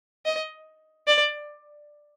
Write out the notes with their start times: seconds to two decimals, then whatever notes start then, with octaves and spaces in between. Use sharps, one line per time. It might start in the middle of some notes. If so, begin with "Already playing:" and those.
0.25 D#5
1.07 D5